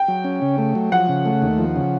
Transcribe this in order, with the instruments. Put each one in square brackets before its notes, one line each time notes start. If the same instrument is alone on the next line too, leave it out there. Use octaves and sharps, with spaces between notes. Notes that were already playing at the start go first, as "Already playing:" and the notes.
Already playing: [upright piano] G5
[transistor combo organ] F#3
C#4
C#3
A3
F#3
[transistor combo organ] F3 [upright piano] F#5
[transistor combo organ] C#3
A3
D#2
F3
C#3